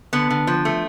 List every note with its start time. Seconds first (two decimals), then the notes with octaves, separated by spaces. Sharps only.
0.13 D3 B3
0.30 D3
0.47 F3
0.65 A3